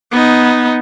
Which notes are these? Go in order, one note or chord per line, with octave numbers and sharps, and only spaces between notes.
B3 D#4